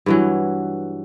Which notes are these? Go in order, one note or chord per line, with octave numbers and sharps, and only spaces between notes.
G2 E3 F#3